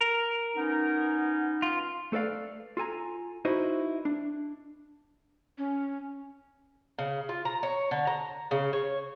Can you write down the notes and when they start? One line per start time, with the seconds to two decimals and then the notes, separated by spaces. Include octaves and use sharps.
0.01 A#4
0.56 B3 C#4 D#4
1.62 F4
2.12 A3 A4 B4 D5 F5
2.77 F4 A4 G#5 A#5
3.45 D#4 E4 F#4 B4 C5 D#5
4.05 D4
5.58 C#4
6.99 C#3
7.29 F4
7.45 A#5
7.63 C#5
7.91 D3
8.07 A#5
8.51 C#3
8.73 C#5